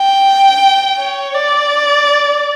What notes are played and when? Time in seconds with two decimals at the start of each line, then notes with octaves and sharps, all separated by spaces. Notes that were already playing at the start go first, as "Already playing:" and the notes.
Already playing: G5
0.98 C#5
1.34 D5